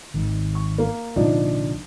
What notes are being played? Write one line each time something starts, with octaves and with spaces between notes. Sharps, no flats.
G#1 D#3
C#6
A#3
C2 A#2 D3 F3 D4 D#4